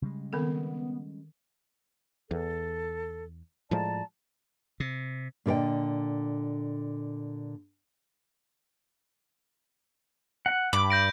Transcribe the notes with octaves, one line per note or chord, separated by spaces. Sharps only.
C#3 G3 G#3
D#3 B3 C4 A4
E2 A4
A2 F3 G#3 D5 A5 A#5
C3
A#2 D3 B4 D#5 G5
F#5
G2 B5 D6
G6 A#6 D7